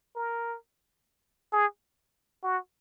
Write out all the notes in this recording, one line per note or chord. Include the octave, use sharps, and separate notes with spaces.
A#4
G#4
F#4